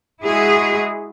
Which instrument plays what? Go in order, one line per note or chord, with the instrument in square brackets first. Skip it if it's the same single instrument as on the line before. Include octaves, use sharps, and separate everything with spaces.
[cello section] G#3 E4 F#4 G#4